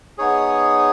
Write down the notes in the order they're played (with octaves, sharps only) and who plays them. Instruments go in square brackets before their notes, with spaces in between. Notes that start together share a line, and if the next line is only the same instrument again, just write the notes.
[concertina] B3 D#4 G#4 C#5